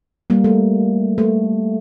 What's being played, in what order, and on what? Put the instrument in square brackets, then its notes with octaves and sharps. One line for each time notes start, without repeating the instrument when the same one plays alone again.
[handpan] G3 A#3
A3
A3